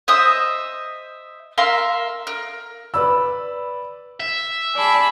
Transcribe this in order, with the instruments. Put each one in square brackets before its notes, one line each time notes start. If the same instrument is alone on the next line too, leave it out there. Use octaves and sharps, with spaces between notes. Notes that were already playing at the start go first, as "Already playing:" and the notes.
[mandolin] C5 D#5 E5 D#6
A#4 E5 F5 C6
A#4
[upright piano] B4 D5 B5 E6
[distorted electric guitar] E5
[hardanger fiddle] G#4 B5 [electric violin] D5 A5